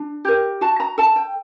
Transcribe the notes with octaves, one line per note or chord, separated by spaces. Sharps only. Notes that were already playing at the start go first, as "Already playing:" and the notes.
Already playing: D4
G4 A#4
F#4 A5
A#5
A4 A5
G5